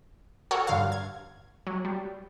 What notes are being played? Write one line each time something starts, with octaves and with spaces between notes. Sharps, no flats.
F#4 A4 A#4 C#5 F#5
G2 D3 F5
G#6
F#3
G3